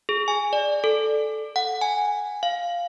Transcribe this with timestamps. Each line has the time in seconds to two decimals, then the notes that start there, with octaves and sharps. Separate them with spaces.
0.09 G#4
0.28 G#5
0.53 D5
0.84 A4
1.56 F#5
1.81 G#5
2.43 F5